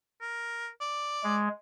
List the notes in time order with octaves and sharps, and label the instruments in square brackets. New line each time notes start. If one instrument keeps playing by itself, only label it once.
[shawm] A#4
D5
[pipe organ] G#3